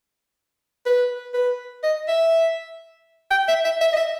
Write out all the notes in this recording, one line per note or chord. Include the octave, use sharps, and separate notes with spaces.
B4
B4
D#5
E5
G5
E5
E5
E5
D#5
E5